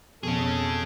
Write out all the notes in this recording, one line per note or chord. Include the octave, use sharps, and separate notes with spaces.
F2 B2 C#4 G#4 A4